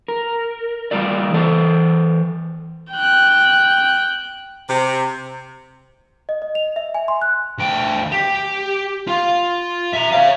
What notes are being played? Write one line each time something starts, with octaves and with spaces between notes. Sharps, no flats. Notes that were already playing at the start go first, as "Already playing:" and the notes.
A#4
C#3 G3 A#3 F#4 D5
E3 A4 C5
G5 F#6
C3
D#5
D#5
F7
E5
G#5
C6
F#6
D2 G5
G4
F4
E5 A#5
C#5 F5